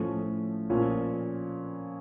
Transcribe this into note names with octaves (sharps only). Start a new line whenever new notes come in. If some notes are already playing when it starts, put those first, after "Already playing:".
Already playing: A2 F3 A3 C#4
A#2 F3 C#4